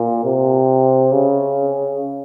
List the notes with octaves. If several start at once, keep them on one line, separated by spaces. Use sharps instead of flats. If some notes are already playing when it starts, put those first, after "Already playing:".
Already playing: A#2
C3
C#3